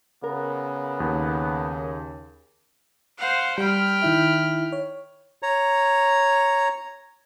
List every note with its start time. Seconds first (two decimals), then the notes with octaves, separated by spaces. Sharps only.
0.24 C#3 B3 A#4
1.00 D#2
3.18 C5 F5 F#5
3.58 G3 G5 B5 F6
4.02 D#3 E4 E5
4.72 C#5
5.43 C#5 A#5